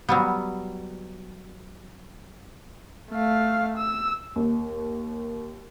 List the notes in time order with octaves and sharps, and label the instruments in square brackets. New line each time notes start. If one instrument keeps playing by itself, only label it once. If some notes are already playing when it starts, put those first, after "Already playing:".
[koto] F#3 G3 B3
[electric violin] A3 F5
E6
[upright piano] D#2